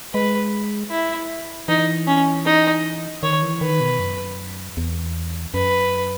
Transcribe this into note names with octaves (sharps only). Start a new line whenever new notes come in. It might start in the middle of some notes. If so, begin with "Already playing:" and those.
G#3 B4
E4
E3 D#4
C#4
D#4
D#3 C#5
E3
D#3 B4
B2
F#2
E2
F#2 B4